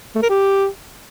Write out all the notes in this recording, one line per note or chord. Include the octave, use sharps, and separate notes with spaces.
A3
A#4
G4